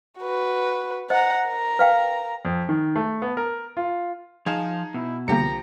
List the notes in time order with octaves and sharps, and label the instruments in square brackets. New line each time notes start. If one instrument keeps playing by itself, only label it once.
[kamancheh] F#4 B4
[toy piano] C5 D#5 [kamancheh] F#5 A#5
[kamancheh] A#4 A#5
[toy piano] B4 F5 G5
[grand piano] F2
D#3
A3
B3
A#4
F4
[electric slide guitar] F3 F5 A5 [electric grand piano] D#4 G#4 G#6
[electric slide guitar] B2 [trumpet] E4
[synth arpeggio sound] C2 D3 A#3 [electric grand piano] F3 G4 C#7 [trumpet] A#5